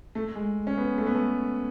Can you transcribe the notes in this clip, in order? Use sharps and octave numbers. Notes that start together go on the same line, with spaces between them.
A3
G#3
C#4
B3
A3
B3
A3